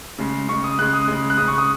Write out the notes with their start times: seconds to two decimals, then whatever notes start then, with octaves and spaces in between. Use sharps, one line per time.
0.19 C#3 G#3
0.48 C#3 C#6
0.53 G#3
0.64 D#6
0.79 C#3 G#3 F#6
0.93 D#6
1.08 C#3 G#3
1.30 F#6
1.37 C#3 G#3 D#6
1.48 C#6
1.58 D#6